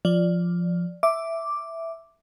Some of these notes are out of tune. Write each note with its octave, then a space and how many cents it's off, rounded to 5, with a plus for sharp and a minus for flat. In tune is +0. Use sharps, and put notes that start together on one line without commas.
F3 +0 D5 +0
E5 +0 D6 +0